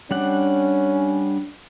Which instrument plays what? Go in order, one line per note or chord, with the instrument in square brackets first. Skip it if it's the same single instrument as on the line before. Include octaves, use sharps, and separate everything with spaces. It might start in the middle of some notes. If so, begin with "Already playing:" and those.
[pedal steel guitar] G3 D4 F#5 [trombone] C#4